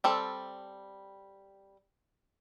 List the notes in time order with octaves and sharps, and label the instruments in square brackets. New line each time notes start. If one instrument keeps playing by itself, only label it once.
[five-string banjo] G3 C4 A4